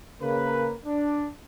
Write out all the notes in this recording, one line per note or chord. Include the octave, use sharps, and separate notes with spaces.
C#3 A#3 A#4 B4
D4